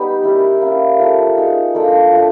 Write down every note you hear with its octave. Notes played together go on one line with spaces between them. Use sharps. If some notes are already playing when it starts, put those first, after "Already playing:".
Already playing: G3 B3 D#4 G4 B4
C#4 E4 G4 A#4
A#3 C#4 E4
A3 C#4 F4 A#4
D#4 G#4 C#5
A#3 D4 F4 A4
F3 A3 D4